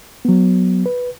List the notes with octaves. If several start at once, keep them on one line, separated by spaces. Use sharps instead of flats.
F#3 B3
B4